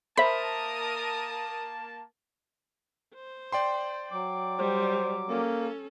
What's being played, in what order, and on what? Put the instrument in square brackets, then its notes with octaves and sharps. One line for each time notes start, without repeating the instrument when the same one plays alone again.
[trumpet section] A#3 A5 [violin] A#4 D#6 [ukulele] C5 E5 [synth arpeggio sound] B5
[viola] C5
[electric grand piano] D5 G5 C6
[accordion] F#3 D6
[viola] G3 [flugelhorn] C5
[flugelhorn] A#3 [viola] C#4 A4